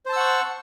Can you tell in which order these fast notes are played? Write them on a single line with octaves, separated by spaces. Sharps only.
C5 A5 E6 F#5 C#6